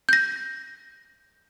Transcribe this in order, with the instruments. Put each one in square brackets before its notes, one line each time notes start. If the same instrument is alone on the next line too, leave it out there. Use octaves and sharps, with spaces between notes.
[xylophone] G6 A#6